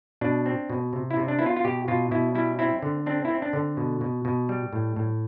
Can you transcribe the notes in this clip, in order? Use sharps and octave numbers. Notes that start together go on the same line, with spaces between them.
B2 D4
C4
B2
C3
E4
C3
D4
B3 E4
F4
F4
B2 G4
B2 F4
B2 E4
G3 E4
C4 E4
D3
C4 D4
E4
C4
D4
D3
B2
B2
B2
G3
A2
A2